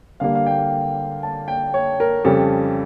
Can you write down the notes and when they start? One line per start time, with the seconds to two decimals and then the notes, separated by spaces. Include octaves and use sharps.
0.20 D3 G3 A#3 F5
0.35 F5
0.46 G5
1.23 A5
1.48 G5
1.74 C#5
2.00 A#4
2.24 F2 C#3 G3 A4